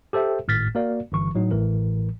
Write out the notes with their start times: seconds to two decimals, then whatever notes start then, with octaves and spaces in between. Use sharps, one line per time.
0.13 G4 A4 C5 E5 G5
0.48 G#1 A2 F6 A6 B6
0.75 A#3 F#4 A#4 D5 F5
1.12 G1 E3 C#6
1.34 A2 F#3 D#4
1.51 A1 A2 E3 A#4